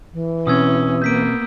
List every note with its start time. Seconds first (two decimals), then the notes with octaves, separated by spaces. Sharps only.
0.13 E3
0.47 B2 C4 C#4 D#6 E6 G#6
1.02 A#3 B3 G6 B6 D7